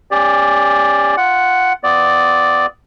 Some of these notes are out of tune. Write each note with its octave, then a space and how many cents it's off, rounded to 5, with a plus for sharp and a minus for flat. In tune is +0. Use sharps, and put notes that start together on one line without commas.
C#4 +0 G4 +30 D5 +0
F4 +0 F#5 +0
B3 +30 F4 +25 D5 +0